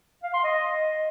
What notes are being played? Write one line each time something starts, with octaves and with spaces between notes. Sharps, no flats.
F5
C6
D#5